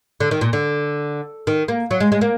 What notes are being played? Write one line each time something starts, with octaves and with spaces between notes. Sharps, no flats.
D3
D#3
A#2
D3
D#3
A#3
F#3
G#3
G#3
A#3